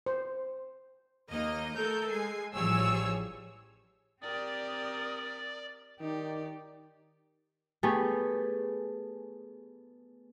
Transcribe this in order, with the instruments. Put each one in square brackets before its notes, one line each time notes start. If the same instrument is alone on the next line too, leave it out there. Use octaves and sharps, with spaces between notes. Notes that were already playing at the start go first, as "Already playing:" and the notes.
[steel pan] C5
[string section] D#2 A#3 D#4 D#5
A3 A4 A#4 G6
G#3 G#5 C7
A1 F3 G3 G#4 C#5 E6
[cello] C4 G4 [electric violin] A#4 D#6 [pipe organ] D5
[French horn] D#3 [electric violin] D#4 D5 [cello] G4
[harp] A3 B3 G4 G#4